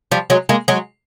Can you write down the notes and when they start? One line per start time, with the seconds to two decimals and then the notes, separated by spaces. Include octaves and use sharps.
0.11 F3 G3
0.30 F#3 G#3
0.49 G#3 A#3
0.68 F#3 G#3